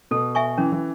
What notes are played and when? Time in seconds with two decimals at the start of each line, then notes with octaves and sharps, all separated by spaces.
0.11 B2 A4
0.35 E5 G#5 C#6
0.58 E3 C#4
0.72 E3